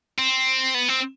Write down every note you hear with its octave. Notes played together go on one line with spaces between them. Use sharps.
C4
B3
C4